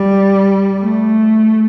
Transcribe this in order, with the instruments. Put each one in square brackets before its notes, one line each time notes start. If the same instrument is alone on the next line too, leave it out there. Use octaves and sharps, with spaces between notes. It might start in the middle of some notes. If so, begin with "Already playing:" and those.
Already playing: [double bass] G3
A3